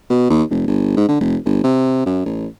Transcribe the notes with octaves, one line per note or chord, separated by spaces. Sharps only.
B2
D#2
F1
G1
G#2
D3
F1
G1
C3
F#2
A1